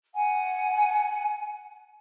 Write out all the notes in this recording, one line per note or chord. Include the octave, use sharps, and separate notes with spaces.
F#5 G#5